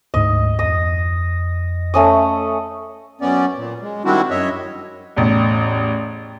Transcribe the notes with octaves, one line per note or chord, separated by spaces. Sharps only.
D2 G#2 D#5
F2 D#5 D#6 A#6
A3 C#4 D#6
F#2 B3 C#4 D5
A#2
G#3
D#3 G3 C4 D4 E4 F#4
F#2 C#5 D#5 E5
A1 E2